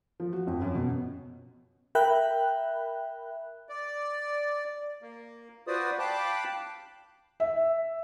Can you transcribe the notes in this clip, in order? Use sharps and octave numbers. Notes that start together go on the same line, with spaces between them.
F3
F#4
F2
F#2
B2
A#4 E5 G5 B5 F#6
D5
A#3
F4 F#4 B4 C5 D5 D#6
F5 G5 A5 B5 D6 F#6
E5